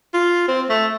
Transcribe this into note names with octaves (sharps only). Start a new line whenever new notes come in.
F4
C4
A3